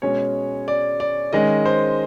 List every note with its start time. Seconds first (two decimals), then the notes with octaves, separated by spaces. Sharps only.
0.02 B2 G#3 C#4 C#5
0.68 D5
1.00 D5
1.33 D#3 G#3 C#4 D#5
1.65 C5